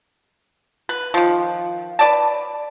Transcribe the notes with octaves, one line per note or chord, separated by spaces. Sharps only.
B4
D#3 F3
B4 D5 A5